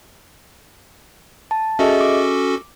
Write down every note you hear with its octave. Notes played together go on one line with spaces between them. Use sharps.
A5
C#4 F#4 G#4 A4 D#5 E5
D6